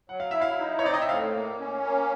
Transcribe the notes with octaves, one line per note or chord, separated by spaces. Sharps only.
F#3 F#5
F5
E4 E5
F5
D#4
C#5
C4 D5
D#5
E5
A2 F5
A#3
C#4
A#3